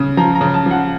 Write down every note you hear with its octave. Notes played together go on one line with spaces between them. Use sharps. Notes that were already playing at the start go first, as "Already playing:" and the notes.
Already playing: C#3
F3 A#5
A#5
C#3
A5
F3 F#5